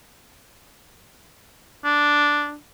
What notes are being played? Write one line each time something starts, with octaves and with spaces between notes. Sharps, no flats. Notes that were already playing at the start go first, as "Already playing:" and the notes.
D4